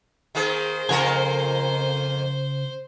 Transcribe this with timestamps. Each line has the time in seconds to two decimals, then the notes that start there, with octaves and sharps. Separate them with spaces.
0.35 D#3 A#3 G#4 C5
0.89 F2 C#3 A#3 A#4 G#5